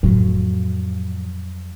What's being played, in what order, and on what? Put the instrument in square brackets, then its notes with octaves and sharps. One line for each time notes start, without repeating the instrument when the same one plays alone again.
[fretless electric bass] F2 F#3 [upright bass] A2 F3